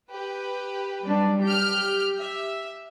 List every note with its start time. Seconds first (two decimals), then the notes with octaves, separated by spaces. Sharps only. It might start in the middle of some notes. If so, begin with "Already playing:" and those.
0.11 G4 B4
1.02 F#3 G3 D4
1.45 G4 F6 G6
2.18 E5